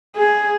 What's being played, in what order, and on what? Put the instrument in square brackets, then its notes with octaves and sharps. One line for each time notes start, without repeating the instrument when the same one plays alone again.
[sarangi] G#4